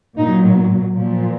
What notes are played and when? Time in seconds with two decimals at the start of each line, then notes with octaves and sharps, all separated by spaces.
0.18 A#2 F#3 D#4
0.94 A#2 F3